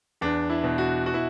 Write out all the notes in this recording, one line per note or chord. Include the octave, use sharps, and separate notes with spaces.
E2 D4
E4
B2
F#4
F#4
E4